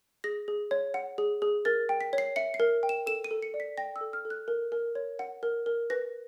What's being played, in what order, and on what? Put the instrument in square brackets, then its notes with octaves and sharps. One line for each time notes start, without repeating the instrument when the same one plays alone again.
[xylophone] G#4 A#6
G#4
C#5
F#5
G#4
G#4
A#4 A6
G5
B6
C#5
C7
E5 C#7
C7
A#4
G5
E7
A4 E7
D#7
A4
C#7
D5
B6
G5 A#6
E6
A4
F6
A4
F#6
A#4
A#4
C#5
F#5
A#4
A#4
B4 A#6